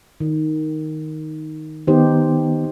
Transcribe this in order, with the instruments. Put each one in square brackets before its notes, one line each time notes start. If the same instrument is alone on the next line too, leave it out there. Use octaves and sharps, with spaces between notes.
[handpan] D#3
[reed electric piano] D#3 B3 [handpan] D#4 G4 C5